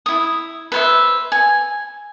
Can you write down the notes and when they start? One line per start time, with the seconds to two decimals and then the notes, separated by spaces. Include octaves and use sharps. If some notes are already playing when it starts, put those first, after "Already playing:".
0.06 E4 D#6
0.72 B4 C5 E5
1.32 G#5